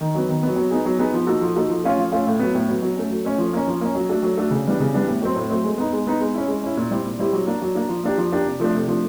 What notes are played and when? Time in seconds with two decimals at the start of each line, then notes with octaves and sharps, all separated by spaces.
0.01 D#3
0.15 F#3 B3
0.29 D#3
0.43 F#3 B3
0.56 F#3
0.71 B3 D#4 G#4
0.85 F#3
0.99 B3 D#4 G#4
1.14 F3
1.27 A#3 D#4 F#4 A4
1.41 F3
1.56 A#3 D#4 F#4 A4
1.69 F3
1.84 A3 C#4 F4 A4
1.97 F3
2.12 A3 C#4 F4 A4
2.27 A2
2.39 F#3 B3
2.55 A2
2.69 F#3 B3
2.82 F#3
2.96 A3 C#4
3.10 F#3
3.25 A3 C#4
3.38 F3
3.53 A#3 C#4
3.67 F3
3.81 A#3 C#4
3.95 F#3
4.09 A3 D4 F#4 A4
4.23 F#3
4.37 A3 D4 F#4 A4
4.51 C#3
4.65 E3 G3 B3 D4
4.80 C#3
4.94 E3 G3 B3 D4
5.08 A2
5.22 F#3 A3 C4
5.36 A2
5.49 F#3 A3 C4
5.64 G#3
5.78 B3 D#4
5.93 G#3
6.07 B3 D#4
6.21 G#3
6.34 C#4 E4
6.48 G#3
6.63 C#4 E4
6.77 A#2
6.91 G3 C4 E4 G4
7.06 A#2
7.19 G3 C4 E4 G4
7.33 F#3
7.47 A#3 D4
7.62 F#3
7.75 A#3 D4
7.89 F3
8.04 A#3 D4 G4
8.17 F3
8.32 A#3 D4 G4
8.46 C3
8.60 F3 A3 D4
8.75 C3
8.88 F3 A3 D4